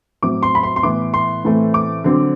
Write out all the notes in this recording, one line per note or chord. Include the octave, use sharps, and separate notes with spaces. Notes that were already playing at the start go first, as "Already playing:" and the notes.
A2 F#3 C4 D6
C6
B5
C6
C6
A2 E3 B3 D6
C6
A2 E3 A3 C4
D6
D3 F#3 C4